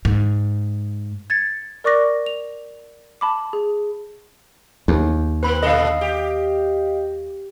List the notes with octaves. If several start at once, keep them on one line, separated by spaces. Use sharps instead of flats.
G#2
G#6 A6 C#7
A#4 D5 C#6 D6 F#6 A#6
F7
A5 B5 D6
G#4
D#2
A#3 C4 B4 B5
A#2 D3 A4 D#5 F5
G4